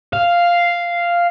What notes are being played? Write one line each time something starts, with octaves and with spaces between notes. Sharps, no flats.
F5